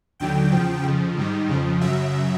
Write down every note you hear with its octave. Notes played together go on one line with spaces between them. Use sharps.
D#2 D3 F#3 G5
E2 C#3 F3
F2 C#3 F3
G#2 D#3 G3
F2 C#3 F3
F#2 C#3 F#3 E5